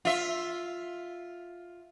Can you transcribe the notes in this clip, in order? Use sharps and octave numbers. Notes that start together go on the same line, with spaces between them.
F4 E5